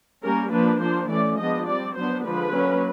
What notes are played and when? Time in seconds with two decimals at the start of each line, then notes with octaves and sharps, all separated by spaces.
0.23 G3 A#3 C#4 A#4
0.51 F3 A#3 D4 B4
0.80 F3 A#3 D4 C5
1.09 E3 A3 C#4 D5
1.38 F3 G#3 B3 D4 D#5
1.67 G3 C4 D5
1.96 F#3 B3 D4 C5
2.25 D3 F3 G#3 B4
2.53 F#3 A#3 C#4